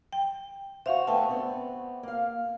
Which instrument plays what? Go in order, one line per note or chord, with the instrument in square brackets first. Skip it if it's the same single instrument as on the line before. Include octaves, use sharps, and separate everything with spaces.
[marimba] G5
[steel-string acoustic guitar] F#4 C5 [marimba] E5 F5
[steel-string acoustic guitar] D3 A3 B3 [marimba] G5 A5
[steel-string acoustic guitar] B3 C4 D5
A#3 F5